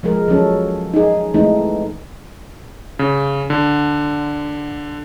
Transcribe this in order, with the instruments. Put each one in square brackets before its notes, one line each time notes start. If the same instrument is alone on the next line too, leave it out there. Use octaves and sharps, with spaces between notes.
[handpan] F3 G#3 G#4 A#4
F3 F#3 C#4 A4
D#4 G#4
E3 G#3 A3 C4 D#4
[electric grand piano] C#3
D3